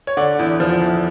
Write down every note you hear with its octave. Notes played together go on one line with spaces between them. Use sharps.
C#5
D3 D5
E2
F3
E2